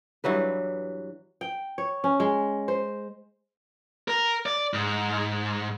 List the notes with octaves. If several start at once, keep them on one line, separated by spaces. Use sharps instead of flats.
G2 E3 F#3 B4
G5
C#5
C#4
G#3
C5
A#4
D5
G#2